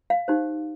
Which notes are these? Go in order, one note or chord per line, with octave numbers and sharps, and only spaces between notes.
F5
D#4 G4 C5